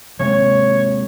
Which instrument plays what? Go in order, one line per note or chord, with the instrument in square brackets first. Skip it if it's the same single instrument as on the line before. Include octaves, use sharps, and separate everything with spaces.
[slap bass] C3 G#3 A#3 [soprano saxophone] C#5